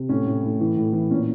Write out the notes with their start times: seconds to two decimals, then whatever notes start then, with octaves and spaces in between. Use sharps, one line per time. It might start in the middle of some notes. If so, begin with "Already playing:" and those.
Already playing: C3
0.09 A2 C#4
0.26 A2
0.44 A2
0.61 E3
0.77 A2
0.93 E3
1.10 A#2 C#4